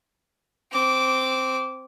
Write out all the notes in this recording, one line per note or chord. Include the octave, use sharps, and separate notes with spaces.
C4 D6